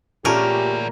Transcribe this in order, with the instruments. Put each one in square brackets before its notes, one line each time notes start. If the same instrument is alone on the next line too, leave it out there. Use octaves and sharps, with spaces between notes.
[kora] A#2 A3 C#4 [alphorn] G4 [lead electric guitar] G#4 D5 [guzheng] A#4